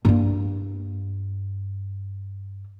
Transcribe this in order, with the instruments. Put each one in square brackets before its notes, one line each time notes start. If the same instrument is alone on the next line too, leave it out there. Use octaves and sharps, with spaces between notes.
[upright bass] G2 A#3